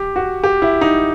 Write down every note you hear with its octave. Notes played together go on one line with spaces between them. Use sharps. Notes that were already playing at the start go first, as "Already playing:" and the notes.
Already playing: G4
F#4
G4
E4
D#4